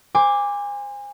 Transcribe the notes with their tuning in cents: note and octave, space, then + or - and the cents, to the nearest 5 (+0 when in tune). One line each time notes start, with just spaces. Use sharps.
C5 +0 G#5 -30 D6 +0